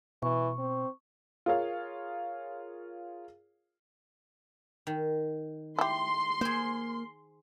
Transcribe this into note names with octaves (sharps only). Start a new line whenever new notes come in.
B2 E3 C#6
C4
F4 G#4 A#4 C#5 F5
D#3
E4 G4 C6
A#3 G#4 C5